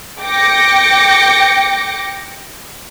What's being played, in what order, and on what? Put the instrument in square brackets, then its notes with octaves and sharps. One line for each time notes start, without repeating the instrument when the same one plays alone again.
[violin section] G5 D6 A#6 C#7